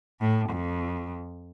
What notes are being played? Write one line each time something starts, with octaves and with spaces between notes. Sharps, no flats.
A2
F2